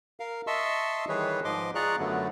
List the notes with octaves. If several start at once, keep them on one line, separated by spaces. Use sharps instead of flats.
A#4 F5
D#5 E5 A5 C6 C#6 E6
D#3 E3 G3 G#4 B4 C#5
G#2 F3 D#5 C6 D6
F4 G#4 D5 A#5 C#6 F#6
F#2 D3 F#3 A3 B3